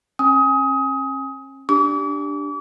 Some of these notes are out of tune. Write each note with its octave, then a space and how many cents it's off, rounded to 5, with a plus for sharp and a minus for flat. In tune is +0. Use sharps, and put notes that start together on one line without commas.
C#4 -45 G#5 -5 D#6 +25
D4 +0 G4 +0 D6 -40